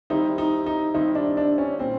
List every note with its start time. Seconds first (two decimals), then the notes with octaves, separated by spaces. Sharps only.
0.10 D#3 G3 C4 D#4 E4
0.38 D#4
0.66 D#4
0.94 D#3 G3 C4 D#4 E4
1.15 D4
1.37 D4
1.58 C#4
1.79 A#2 G3 C4